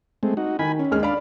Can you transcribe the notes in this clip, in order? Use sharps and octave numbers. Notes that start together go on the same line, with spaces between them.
G#3 A3 C4
D#4 F#4
D#3 G#5 B5
C#4
D#2 G#3 F6
D4 D5 F5 B5